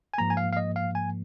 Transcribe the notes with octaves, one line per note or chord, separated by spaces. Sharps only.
G#5
G#2 F3 A#3 A#5
G#5
F5
F5
D#5
F5
G#5